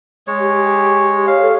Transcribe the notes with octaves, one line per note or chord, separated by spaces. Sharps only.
G#3 C#5
G4
C#5 F5
A4